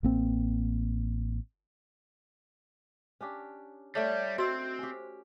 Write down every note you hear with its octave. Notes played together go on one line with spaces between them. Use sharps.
A1 A#3 C4
C#4 D4 G4
G3 A3 D4 C#5 D5
C4 F#4 C5 D#5 E6
C#4 G4